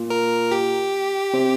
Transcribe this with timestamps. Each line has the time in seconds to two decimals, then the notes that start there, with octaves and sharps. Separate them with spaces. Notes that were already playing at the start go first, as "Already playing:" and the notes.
Already playing: A#2
0.10 A#4
0.52 G4
1.34 C3